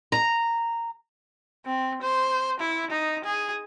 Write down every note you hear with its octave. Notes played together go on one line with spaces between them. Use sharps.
A#5
C4
C5
E4
D#4
G#4